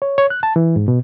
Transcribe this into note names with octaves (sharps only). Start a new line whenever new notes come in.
C#5
C#5
F#6
A5
E3
G#2
B2